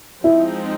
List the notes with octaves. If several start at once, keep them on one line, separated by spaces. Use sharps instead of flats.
F3 G#3 C4 D#4 E4